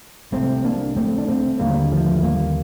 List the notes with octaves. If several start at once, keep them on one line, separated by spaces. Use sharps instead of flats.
C2 C3 A3 C4
A#3 D4
A3 C4
D4
A3 C4
D#2 D3 G3 A#3
F3 A3
G3 A#3